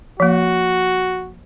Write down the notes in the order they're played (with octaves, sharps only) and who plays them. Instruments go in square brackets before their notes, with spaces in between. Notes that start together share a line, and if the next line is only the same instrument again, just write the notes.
[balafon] F3 A#3 [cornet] F#4